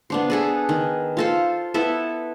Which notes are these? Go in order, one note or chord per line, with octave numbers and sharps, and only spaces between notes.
B3 D4 C5
G#4 A4 B4
D#3
F4 A4 C5
B3 E4 A4 E5